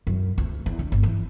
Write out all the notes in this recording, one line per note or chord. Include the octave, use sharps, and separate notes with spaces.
F#2
D2
E2
D3
G1
E3